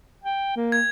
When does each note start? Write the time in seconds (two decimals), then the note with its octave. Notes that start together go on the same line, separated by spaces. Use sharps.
0.24 G5
0.56 A#3
0.72 G#6